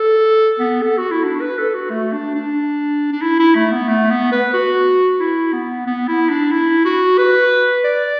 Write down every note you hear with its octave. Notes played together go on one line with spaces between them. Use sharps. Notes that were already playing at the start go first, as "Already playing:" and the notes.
Already playing: A4
B3
A4
F#4
E4
D4
B4
A4
F#4
A3
D4
D4
D4
E4
E4
A3
B3
A3
B3
B4
F#4
E4
B3
B3
E4
D4
E4
F#4
B4
D5